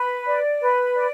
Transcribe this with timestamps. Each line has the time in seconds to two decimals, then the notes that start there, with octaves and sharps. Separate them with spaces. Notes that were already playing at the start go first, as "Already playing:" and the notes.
Already playing: B4
0.27 D5
0.61 B4
0.95 D5